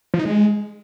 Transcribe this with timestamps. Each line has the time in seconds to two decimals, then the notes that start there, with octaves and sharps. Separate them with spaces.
0.14 F3
0.19 D#4
0.25 G#3